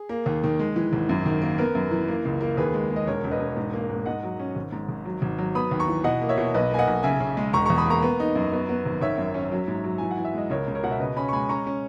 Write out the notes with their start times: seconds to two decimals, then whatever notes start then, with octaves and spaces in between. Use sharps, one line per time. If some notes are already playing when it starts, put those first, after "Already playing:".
Already playing: G#4
0.09 A#3
0.26 D#2
0.44 D#3
0.59 G#3
0.76 E3
0.93 G#1
1.09 F#2
1.26 D#3
1.42 A#3
1.58 B3 A#4
1.75 F#2
1.91 E3
2.08 A#3
2.25 C#2
2.41 A#3
2.57 D#2 G#4 B4
2.74 G#3
2.90 G#3
2.96 D#5
3.07 E1 A#4 C#5
3.24 E1
3.31 B4 D#5
3.40 E1
3.57 G#2
3.73 A#3
3.90 G#2
4.06 G#2 D#5 F#5
4.23 F#3
4.39 C#4
4.56 G#1
4.72 G#2
4.89 G#1
5.05 F#3
5.22 G#1
5.38 F#3
5.55 B3 B5 D#6
5.71 D#2
5.80 A#5 C#6
5.88 E3
6.04 B2 D#5 F#5
6.22 A#3
6.29 C#5 E5
6.38 B2
6.54 B1 B4 D#5
6.71 A#3 G#5
6.79 D#5 F#5
6.87 B1
7.03 C#3 E5 G#5
7.20 C#3
7.37 G#3
7.53 E1 A#5 C#6
7.66 E2 A#5 C#6
7.78 B5 D#6
7.86 A#3 A#5 C#6
8.02 B3
8.20 D#4
8.35 F#2
8.53 B3
8.69 B3
8.86 G#1
9.01 D#3 C#5 E5
9.18 F#2
9.34 C#4
9.52 F#3
9.68 G#2
9.84 F#3
9.98 E3 G#5
10.11 F#5
10.17 E3
10.25 E5
10.34 G#3 D#5
10.50 C#2 A#4 C#5
10.68 C#2
10.75 A#4 C#5
10.83 B2 F#5
10.91 E5
11.00 C#3 B4 D#5
11.16 C#4 G#5 B5
11.28 C#6
11.33 G#3 G#5 B5
11.49 C#4 A#5 C#6
11.66 C#4